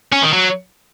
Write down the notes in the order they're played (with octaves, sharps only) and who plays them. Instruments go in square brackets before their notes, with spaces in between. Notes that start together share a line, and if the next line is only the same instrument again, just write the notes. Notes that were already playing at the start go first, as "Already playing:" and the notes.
[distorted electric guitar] C#4
D#3
F#3